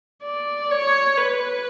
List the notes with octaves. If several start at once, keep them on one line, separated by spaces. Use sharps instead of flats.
D5
C#5
B4